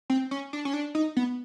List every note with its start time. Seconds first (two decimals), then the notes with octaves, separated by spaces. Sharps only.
0.10 C4
0.31 C#4
0.53 D4
0.65 C#4
0.73 D4
0.95 D#4
1.17 B3